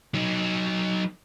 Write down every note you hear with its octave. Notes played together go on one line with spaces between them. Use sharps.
F#3 D#4